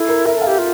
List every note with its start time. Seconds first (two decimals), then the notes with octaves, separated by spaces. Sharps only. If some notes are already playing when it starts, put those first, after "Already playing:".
Already playing: E4 A4
0.09 A#4
0.26 A#4 E5
0.37 A4 F5
0.47 G4
0.58 F4